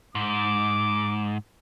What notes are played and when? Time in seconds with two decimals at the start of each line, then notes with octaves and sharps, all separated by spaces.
0.15 G#2 D6